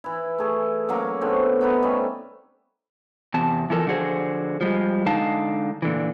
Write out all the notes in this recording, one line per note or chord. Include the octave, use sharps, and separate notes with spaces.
E3 E4
A3 G#4
C#3 F#3 A#3
B2 D3 A3 C4
B3 D#4 A#4 B4
C3 G3 A3 C#4
E2 C3 A5
E3 F3 A4 A#4
D3 F3 F#4 G#4 C5
F3 G3 G#3
D3 G#3 D#4 F5 A5
A#2 D3 E3